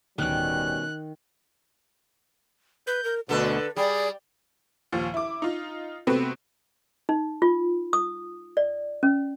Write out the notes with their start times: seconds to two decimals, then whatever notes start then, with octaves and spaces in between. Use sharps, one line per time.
0.18 D1 B2 D#3 G3 C#4 F#6
2.87 B4 G6
3.04 A#4
3.29 D2 B2 D3 A4 B4
3.76 G3 G#4 D5
4.92 D#2 A#2 F3
5.14 E4 D6
5.42 D#4 F4
6.07 C3 A3 B3 C4 F#4 B4
7.09 D#4
7.42 F4
7.93 D#6
8.57 D5
9.03 C#4